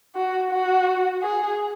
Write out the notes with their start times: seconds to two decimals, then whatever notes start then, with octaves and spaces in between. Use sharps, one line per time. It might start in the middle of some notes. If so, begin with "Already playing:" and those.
0.16 F#4
0.52 F#4
1.23 G#4